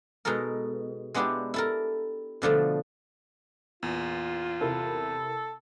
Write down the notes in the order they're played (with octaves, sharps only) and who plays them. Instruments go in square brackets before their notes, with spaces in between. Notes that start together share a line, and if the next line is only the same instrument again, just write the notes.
[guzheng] B2 G#3 D#4 A4 A#4
G#3 B3 D4 E4 G4 G#4
E4 A4 A#4
B2 D3 F3 A3
[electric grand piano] E2 A#2 [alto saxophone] F4
[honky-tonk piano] C3 E4 A#4 [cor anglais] A4